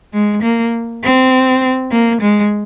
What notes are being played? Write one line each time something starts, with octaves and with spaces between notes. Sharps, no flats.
G#3
A#3
C4
A#3
G#3